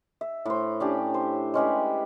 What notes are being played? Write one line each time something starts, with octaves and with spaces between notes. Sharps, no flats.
E5
A2 C5
C#4 D4 G4
C5
G#3 C#4 G4 B4